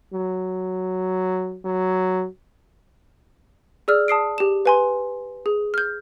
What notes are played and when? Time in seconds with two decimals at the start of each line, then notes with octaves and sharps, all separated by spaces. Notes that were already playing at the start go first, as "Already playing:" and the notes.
0.14 F#3
1.65 F#3
3.88 G#4 D5 E6 F6
4.08 A5 D#6 C7 D7
4.38 G4 E7
4.66 B4 G#5 C6
5.46 G#4
5.74 F6 G6